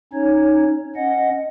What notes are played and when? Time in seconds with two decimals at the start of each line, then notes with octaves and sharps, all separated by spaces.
0.13 C#4 D#4 C#5
0.96 C#4 D#5 F#5